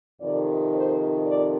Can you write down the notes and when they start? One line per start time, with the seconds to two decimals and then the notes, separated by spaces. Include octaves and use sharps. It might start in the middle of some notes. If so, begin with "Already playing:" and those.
0.21 F2 C3 D#3 D5
0.73 C5
1.25 D5